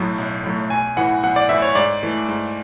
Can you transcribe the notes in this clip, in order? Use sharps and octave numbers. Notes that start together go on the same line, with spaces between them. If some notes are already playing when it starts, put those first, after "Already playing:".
Already playing: B1 A2 F#3 A3
B1
A2 F#3 A3
B1 G#5
A2 E3 F#5
B1 F#5
D5
A2 E3 E5
C#5
G#2 D5
E3 A3
G#2